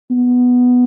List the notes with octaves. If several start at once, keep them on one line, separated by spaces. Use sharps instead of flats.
B3